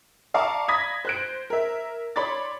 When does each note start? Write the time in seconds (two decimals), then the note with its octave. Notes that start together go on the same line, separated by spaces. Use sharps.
0.34 D5 F5 A5 A#5 C#6 D6
0.68 B5 D#6 G#6 A#6 B6
1.05 C5 F#6 D7
1.50 A#4 E5
2.16 C#5 D5 B5 C6 D6 A6